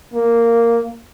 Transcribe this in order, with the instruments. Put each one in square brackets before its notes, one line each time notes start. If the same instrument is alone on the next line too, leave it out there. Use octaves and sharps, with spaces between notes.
[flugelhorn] A#3